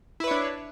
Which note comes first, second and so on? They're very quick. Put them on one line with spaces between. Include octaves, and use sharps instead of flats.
E4 B4 C#5 D4